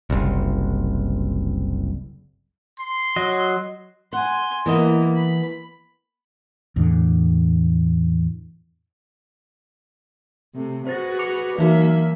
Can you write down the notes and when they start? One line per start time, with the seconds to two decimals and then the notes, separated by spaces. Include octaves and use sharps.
0.10 F#1 C2
2.79 C6
3.16 F#3 D#5
4.13 F#5 G#5 C6
4.66 E3 A#3 B3 D#5
5.16 B5
6.76 E2 A2 D3
10.55 C3 A3
10.87 F#4 G#4 B4 C5 A6 A#6
11.19 D6 C#7 F7
11.58 E3 F#3 A#3 D#4 F#4 E5